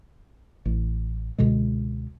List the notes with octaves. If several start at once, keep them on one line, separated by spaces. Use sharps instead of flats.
A1
C#2 B2 D3 G#3